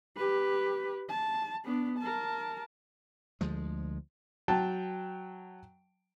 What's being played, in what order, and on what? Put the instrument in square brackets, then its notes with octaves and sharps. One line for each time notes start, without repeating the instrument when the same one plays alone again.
[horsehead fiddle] G4 B4
A5
B3 D4
A#4 A5
[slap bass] D2 F3 G#3
[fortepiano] F#3 G5 A5